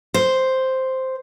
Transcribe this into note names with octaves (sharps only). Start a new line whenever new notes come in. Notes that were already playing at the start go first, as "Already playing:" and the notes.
C5